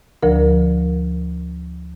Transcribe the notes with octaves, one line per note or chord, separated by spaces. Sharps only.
D2 D3 F3 A#4